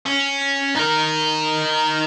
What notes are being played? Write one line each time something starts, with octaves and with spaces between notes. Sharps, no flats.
C#4
D#4 A#4